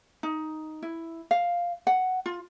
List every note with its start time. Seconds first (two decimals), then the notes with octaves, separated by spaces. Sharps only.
0.23 D#4
0.82 E4
1.31 F5
1.87 F#5
2.26 F4